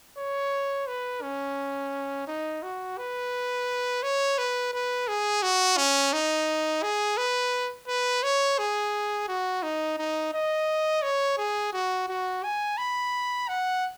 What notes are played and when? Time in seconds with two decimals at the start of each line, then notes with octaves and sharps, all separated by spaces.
0.18 C#5
0.87 B4
1.22 C#4
2.27 D#4
2.63 F#4
2.98 B4
4.03 C#5
4.38 B4
4.73 B4
5.08 G#4
5.43 F#4
5.77 C#4
6.13 D#4
6.83 G#4
7.17 B4
7.88 B4
8.23 C#5
8.58 G#4
9.29 F#4
9.63 D#4
9.98 D#4
10.33 D#5
11.03 C#5
11.38 G#4
11.73 F#4
12.09 F#4
12.44 G#5
12.78 B5
13.49 F#5